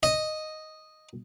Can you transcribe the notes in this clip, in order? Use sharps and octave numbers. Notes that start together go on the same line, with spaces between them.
D#5